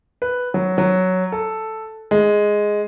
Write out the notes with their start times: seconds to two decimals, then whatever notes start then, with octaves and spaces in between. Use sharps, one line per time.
0.22 B4
0.54 F#3
0.78 F#3
1.32 A4
2.11 G#3